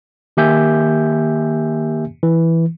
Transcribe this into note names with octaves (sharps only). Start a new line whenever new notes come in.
D#3 A#3 G4 E5 G#5 G6
E3